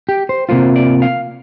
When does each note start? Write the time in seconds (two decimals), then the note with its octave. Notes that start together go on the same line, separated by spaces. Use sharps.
0.09 G4
0.29 C5
0.49 C3 A#3 F4 C5
0.76 D5
1.02 F5